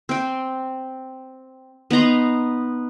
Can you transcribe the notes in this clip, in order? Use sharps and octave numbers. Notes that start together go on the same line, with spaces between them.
C4 G5
B3 D#4 A#5 C6